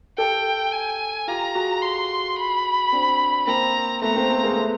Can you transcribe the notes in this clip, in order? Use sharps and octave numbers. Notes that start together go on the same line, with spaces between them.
G4 A4 G5
G#5
F4 G4 A#5
F#4 G#4
C6
B5
C4 D4
A#3 C4 A#5
A3 B3 A#5
A#3 C4
A3
G#3 A#3
A3 B3